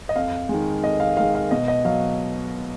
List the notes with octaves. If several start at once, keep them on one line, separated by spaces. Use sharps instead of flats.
D#5
F2 F5
D#3 G#3
F2 D#5
F5
D#3 G#3 F5
F5
B2 D#5
D#5
F#3 F5